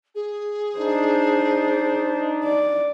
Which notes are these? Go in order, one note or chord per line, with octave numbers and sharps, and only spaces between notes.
G#4
D4 D#4 C5
D5